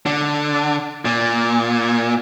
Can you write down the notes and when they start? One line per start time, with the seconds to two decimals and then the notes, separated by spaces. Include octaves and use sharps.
0.06 D3
1.05 A#2